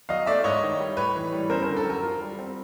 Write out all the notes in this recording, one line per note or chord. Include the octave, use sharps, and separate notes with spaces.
F#3 D#5 F5
A3 D5 E5
G#2 C#5 D#5
D#3
G3
A2 B4 C#5
E3
G3
F#2 A#4 C5
A#4
D3
A4
F#3 A#4
F4
G3
C4